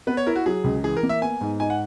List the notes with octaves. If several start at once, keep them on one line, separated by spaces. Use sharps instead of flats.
B3 B4
C#5
E4 A#4
F#4
F#3 G#4
C#2
E3 G#4
A#4
A#3
E5
B3 G#5
G#2
D#4 G#5
F#5